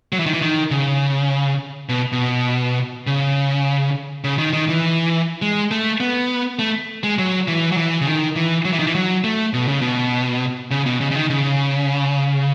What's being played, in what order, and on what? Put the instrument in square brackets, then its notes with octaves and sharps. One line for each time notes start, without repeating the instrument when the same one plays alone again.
[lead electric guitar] F#3
E3
D#3
E3
D#3
C#3
B2
B2
C#3
C#3
D#3
D#3
E3
G#3
A3
B3
A3
G#3
F#3
E3
F#3
E3
C#3
D#3
E3
F#3
E3
D#3
E3
F#3
A3
B2
C#3
B2
C#3
B2
C#3
C#3
D#3
C#3